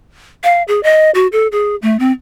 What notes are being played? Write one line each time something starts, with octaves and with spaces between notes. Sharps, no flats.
F5
G#4
D#5
F#4
A4
G#4
A3
C4